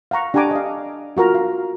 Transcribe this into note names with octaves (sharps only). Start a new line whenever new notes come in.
F5 F#5 A#5 C#6
D4 G4 F#5 G#5 A#5 D6
D#5 F5
F4 F#4 A#4 A#5
F5